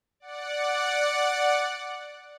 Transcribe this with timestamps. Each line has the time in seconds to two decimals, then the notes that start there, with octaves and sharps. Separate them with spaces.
0.20 D5 F#5